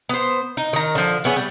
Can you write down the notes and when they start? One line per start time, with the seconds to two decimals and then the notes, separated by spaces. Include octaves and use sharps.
0.09 B3 C5
0.57 D#4
0.73 D#3 A#5
0.95 D3 F3
1.24 A3 B3 C#4 G#4
1.36 G3